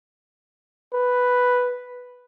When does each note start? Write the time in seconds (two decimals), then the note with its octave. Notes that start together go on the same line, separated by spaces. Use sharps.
0.94 B4